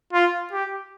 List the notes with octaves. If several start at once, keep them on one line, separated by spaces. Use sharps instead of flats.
F4
G4